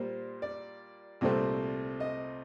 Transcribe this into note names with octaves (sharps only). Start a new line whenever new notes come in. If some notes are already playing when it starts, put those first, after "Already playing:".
Already playing: A#2 G3 A#3 C5
D5
C2 A#2 A3 C4
D#5